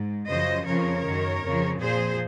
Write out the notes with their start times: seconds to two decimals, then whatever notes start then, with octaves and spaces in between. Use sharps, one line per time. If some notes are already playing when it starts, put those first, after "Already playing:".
Already playing: G#2
0.27 F#2 C#3 F3 C5 D#5
0.66 F2 C#3 F3 A#4 C#5
1.05 F#2 D#3
1.43 F2 C#3 F3
1.80 A#2 F3 G#4 C5